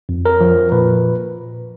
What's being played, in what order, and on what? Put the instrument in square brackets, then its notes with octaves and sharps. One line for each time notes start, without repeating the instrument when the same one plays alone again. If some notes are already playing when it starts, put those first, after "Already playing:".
[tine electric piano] F2
A#4
F3
A#2 B4